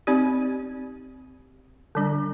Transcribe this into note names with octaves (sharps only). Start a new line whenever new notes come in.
C4 D#4 G4 D5
D3 G3 D4